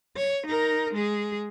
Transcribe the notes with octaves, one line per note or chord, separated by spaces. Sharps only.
C#5
D#4 A#4
G#3 G#4